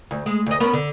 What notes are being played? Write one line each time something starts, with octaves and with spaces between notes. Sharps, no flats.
D2
G#3
D2 D#5
B3 C#4 A#4
D3